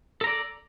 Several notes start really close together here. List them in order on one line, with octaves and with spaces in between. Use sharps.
A4 A#5 D5